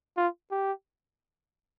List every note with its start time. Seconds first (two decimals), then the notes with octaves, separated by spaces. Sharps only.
0.17 F4
0.51 G4